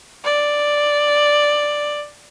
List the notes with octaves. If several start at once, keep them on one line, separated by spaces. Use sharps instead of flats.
D5